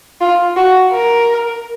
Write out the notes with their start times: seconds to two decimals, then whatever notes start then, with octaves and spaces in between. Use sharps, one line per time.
0.21 F4
0.56 F#4
0.92 A#4